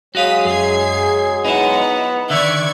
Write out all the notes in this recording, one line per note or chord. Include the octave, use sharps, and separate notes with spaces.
F#3 G#3 F#4 F5 D#6 B6
F#2 G#4 G#6 C7
B3 D#4 E4 F#5 A#5
D3 D#3 D5 E5 C#6 G#6